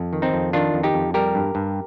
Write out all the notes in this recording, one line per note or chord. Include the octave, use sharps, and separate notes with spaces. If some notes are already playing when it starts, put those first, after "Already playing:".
Already playing: F2
D#3
C4 D#4
F2
D#3 D4 F4
F2
D#4 G4
F2
G3 G4 A#4
G2
G2